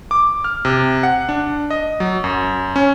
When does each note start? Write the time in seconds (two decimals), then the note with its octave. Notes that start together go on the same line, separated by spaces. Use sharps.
0.11 D6
0.44 F6
0.65 C3
1.03 F#5
1.29 D4
1.70 D#5
2.00 F#3
2.24 F#2
2.76 C#4